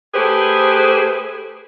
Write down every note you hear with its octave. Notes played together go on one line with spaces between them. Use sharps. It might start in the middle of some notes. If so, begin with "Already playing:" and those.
A3 G4 G#4 B4 C5